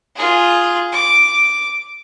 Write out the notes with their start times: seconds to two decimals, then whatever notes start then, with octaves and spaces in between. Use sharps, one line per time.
0.16 F4 G#4
0.92 D6